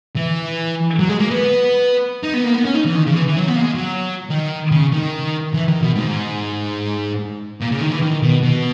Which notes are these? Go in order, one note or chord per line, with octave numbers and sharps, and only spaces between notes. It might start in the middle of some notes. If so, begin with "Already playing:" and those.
E3
F#3
G#3
A#3
B3
D#4
B3
A#3
B3
C#4
D#4
E3
D#3
C#3
E3
E3
F#3
B3
A#3
G#3
F#3
D#3
C#3
D#3
E3
D#3
B2
G#2
A#2
C#3
D#3
E3
D#3
B2
B2